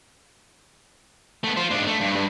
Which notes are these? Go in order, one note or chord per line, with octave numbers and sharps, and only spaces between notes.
A3 B3
F4 C5
G#2 D4
A3
G2
G2